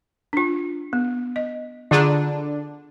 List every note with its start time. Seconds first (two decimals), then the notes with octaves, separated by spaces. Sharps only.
0.33 D4 F4
0.93 B3
1.36 D#5
1.91 D3 D4 F4 G#4 A#5